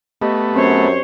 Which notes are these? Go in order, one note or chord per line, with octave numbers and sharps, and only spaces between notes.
A3 B3 G4 D#5 C#6
F#2 C4 C#4 C5 C#5